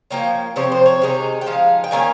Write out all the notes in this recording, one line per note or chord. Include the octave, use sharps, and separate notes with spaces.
F3 A#3 C#4 G5
C3 F3 C4 C#5
C5
C#5
C3 D#3 G#3 D#4
G5
F3 G#3 D#4 F5
G5
D#3 A#3 C#4 G#5